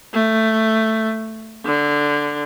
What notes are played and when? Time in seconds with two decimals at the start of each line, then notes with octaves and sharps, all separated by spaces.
0.14 A3
1.66 D3